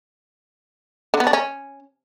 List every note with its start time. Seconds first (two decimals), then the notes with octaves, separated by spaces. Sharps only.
1.14 D3
1.20 B3
1.27 D4
1.33 C#4